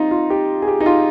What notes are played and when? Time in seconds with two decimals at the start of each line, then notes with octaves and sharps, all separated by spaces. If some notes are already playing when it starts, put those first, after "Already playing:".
Already playing: G3 C4 D#4 F4
0.11 F4
0.30 G4
0.62 G#4
0.68 G4
0.80 D#4
0.86 F4